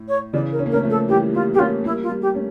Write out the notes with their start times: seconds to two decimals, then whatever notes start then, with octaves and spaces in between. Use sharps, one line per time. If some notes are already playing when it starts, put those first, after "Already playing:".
Already playing: A2
0.08 C#5
0.33 C#3 E3 D5
0.52 A#4
0.59 C#4
0.66 A#3
0.71 A3 C#4 A#4
0.83 F3 A3
0.90 A4
1.08 E3 G3 G4
1.34 G3 A#3 F4
1.54 A#3 G4
1.59 A3 C#4 F4
1.84 G3 A#3 E4
2.03 F4
2.09 G3 A#3
2.22 G4
2.35 A3 C#4